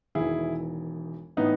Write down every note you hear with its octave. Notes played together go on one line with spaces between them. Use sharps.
E1 E2 D#3 E4 G#4
A2 E3 B3 D#4